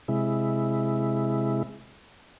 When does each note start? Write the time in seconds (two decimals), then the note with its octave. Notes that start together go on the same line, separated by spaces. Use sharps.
0.08 C3 G#3 E4